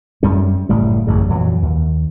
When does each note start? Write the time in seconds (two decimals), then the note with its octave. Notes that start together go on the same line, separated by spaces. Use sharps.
0.23 F#2 G3 C#4
0.69 F#1 A2 G3
1.07 A1 F#2 C#3
1.29 F2 A#2 E3 F#3
1.62 D#2